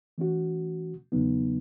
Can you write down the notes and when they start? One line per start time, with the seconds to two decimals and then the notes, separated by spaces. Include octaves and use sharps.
0.18 E3 A3 C#4 F#4
1.12 E2 C#3 F#3 B3 D#4